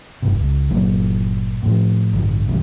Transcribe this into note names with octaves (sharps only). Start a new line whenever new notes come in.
F1 G2 C3
C#2
G1 A#2 F#3 A#3
A2 F3
A1 G2 D3
B1 F#2 D#3 G3